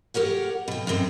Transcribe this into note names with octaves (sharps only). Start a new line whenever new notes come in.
G4 A#4 C#5 F#5
B2 G5
F#2 E3 C4 G5